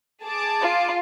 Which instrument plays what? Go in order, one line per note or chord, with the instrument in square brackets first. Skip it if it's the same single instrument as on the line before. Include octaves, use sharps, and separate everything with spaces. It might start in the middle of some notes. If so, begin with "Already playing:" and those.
[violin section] G#4 A5 D6
[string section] F4